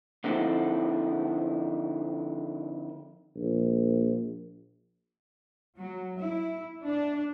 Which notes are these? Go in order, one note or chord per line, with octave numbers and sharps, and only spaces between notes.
D3 F3 C4 D#4 E4 A4
A#1
F#3
E4
D4